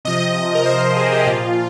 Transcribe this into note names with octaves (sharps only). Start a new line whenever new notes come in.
C3 F3 D#5
A#4
C5
A#4
G#4
G4
A#2 F3 F4